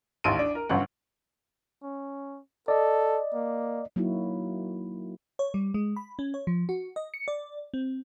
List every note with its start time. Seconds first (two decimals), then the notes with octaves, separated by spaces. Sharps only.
0.24 A1 D#2 C6 D7 D#7
0.39 D4
0.55 A#4
0.69 G1 F#2 F#5
1.83 C#4
2.68 A4 D5 D#5
3.34 A#3
3.96 F#3 A#3 D#4 E4 F#4
5.39 C#5
5.54 G3
5.74 G#3
5.96 B5
6.19 C#4
6.34 C#5
6.47 F3
6.69 F#4
6.96 D#5
7.14 C#7
7.28 D5
7.74 C4